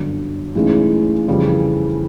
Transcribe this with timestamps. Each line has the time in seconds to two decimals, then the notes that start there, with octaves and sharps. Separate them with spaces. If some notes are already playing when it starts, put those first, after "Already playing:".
Already playing: G1 F#2 D3
0.55 B1 A2 E3 G#3 C#4
1.28 F2 C#3 E3 G3